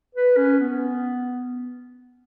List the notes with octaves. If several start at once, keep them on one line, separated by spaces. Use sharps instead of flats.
B4
C#4
B3